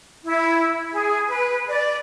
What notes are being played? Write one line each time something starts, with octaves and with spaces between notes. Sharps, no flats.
E4
G#4
B4
D5